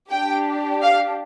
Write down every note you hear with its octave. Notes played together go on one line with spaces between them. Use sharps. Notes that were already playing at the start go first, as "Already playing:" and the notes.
D4 G4 G5
F5